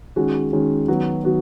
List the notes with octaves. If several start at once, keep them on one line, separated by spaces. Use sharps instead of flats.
D#3 G#3 C#4 F#4
D#3 G#3 C#4 F#4
D#3 F#3 B3 F#4
D#3 F#3 B3 F#4